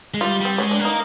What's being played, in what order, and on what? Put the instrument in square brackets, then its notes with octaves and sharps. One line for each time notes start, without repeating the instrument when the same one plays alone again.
[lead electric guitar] G#3
[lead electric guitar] G3 [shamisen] F4
[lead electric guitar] G3 [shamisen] C4
[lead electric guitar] G#3 [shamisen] C#4
[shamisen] D4
[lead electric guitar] A#3
[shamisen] D#4